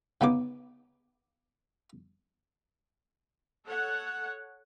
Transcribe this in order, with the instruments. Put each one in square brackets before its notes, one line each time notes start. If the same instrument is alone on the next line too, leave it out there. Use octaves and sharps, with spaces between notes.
[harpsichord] C#3 B3 D#4 D6
[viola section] A4 C#5 F#5